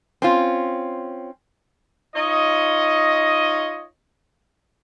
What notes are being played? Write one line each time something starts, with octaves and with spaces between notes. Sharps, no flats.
C4 C#4 F4
D#4 F4 C#5 D#5